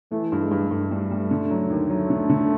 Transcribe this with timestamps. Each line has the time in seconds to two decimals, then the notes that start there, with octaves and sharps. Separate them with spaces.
0.11 E3 A3
0.32 G2
0.41 G#3
0.51 G2
0.71 G2 A3
0.91 G3
1.11 G3
1.31 D3
1.50 F#3
1.70 D#2
1.90 F#3 A3
2.10 D3
2.29 D3